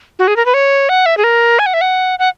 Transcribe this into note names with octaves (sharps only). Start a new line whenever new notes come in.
F#4
G#4
A#4
B4
C#5
F#5
E5
G#4
A#4
G#5
F#5
E5
F#5
F#5